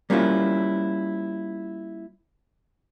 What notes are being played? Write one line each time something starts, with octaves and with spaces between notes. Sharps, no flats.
G3 A#3 C#4 E4 F4